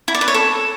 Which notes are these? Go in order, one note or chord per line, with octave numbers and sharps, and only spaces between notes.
E4
D5
B4
C#5
A4